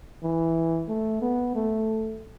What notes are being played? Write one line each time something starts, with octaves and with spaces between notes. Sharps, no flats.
E3
A3
B3
A3